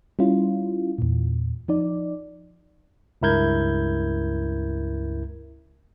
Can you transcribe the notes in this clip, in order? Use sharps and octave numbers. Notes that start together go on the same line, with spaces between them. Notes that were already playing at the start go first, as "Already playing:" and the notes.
G3 C#4 E4 F4
E2 A#2
F3 D#4 D5
C#2 G2 E4 A#4 G6 G#6